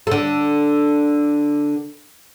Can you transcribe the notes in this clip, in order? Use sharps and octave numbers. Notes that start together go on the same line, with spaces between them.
D3 A4